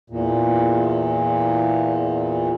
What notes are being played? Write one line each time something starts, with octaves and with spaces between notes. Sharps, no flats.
E2 A#2